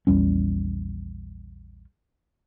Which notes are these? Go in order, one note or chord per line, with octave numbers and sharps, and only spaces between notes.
A#1 E2 G3 C#4